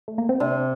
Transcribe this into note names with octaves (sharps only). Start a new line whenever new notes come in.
A3
A#3
C4
C3 D4